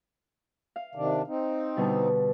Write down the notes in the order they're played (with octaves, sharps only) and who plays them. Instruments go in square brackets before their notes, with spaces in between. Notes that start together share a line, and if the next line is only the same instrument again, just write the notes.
[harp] F5
[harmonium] C3 D#3 D4
C4 D#4
[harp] B2 D3 G3